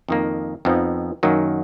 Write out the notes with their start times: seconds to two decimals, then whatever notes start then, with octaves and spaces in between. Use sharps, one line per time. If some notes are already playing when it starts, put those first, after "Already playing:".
0.09 F2 D#3 A#3
0.65 F2 F3 B3 D#4
1.23 F#2 D#3 F#3 A#3